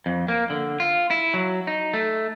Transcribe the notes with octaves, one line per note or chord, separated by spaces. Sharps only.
F2
A#3
D3
F4
E4
F#3
D#4
A3